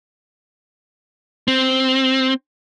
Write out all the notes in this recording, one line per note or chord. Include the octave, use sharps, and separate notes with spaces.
C4